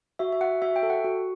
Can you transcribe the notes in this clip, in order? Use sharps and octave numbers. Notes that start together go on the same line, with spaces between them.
F#4 E5
E5
F#4 F#5
F#4 E5
G5
A4
F#5
F#4